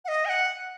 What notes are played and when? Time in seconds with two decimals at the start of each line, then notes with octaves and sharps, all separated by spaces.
0.05 F#5
0.08 D#5
0.25 G#5
0.29 F#5